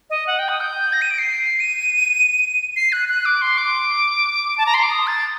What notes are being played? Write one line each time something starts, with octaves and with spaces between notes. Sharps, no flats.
D#5
F#5
G5
D#6
G6
A#6
D#7
D7
C7
D#7
C7
F#6
F#6
D6
C6
D6
A5
A#5
C6
D6
D#6
A6